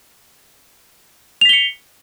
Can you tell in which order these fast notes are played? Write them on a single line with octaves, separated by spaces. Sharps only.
F7 B6 G7 C#7